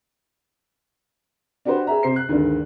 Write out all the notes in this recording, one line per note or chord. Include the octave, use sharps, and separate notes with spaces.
D4 F#4 G4 B4 C5
G#4 E5 A#5
C3 C5 C7
F#6
D2 G2 D#3 G#3 D4